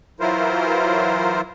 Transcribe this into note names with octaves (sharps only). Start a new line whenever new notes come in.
E3 F#3 E4 F4 A#4 C5